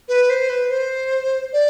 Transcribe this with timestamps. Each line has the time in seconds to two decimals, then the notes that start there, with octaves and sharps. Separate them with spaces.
0.09 B4
0.30 C5
0.49 B4
0.71 C5
1.53 D5